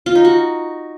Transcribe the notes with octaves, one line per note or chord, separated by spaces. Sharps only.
F4
D#4
F#4